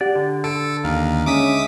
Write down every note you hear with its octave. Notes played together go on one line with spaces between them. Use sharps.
G4 D5 F#5
D3
A4 D7
D#2 F5 A#5 F6
G#3 C#4 E5 D6 D#6 B6